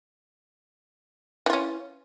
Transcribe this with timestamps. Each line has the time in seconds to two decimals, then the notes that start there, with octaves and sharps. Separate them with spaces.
1.46 E3
1.50 F4
1.53 C#4